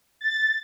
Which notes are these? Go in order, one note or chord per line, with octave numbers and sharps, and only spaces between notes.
A6